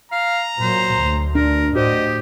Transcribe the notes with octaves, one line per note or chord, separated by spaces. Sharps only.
F5 A#5
A#2 F#3 C5
D2
D4 A#4
A2 F#4 G4 C5 D#5